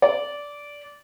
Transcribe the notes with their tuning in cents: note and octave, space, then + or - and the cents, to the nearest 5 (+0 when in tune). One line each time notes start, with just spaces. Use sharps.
D5 -15